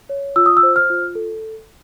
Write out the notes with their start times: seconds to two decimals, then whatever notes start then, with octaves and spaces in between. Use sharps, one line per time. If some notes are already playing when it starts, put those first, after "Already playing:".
0.10 C#5
0.36 F4 E6
0.46 D#6
0.57 E6
0.63 C5
0.76 F6
0.90 F4
1.15 A4